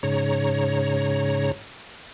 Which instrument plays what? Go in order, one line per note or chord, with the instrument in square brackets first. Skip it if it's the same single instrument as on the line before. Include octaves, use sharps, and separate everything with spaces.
[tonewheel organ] G#2 C#3 C#5 A#5